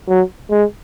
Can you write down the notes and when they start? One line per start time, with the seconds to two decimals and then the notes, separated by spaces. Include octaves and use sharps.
0.09 F#3
0.51 G#3